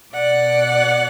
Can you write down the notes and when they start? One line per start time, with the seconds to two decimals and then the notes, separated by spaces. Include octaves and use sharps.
0.13 B2 D5 F#5